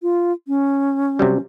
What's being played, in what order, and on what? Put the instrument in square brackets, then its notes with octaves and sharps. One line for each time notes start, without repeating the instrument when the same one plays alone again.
[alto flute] F4
C#4
[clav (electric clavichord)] C3 F#3 G3